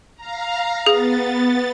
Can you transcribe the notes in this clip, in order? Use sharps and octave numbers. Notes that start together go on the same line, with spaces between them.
F5 A#5
B3 G#4 A6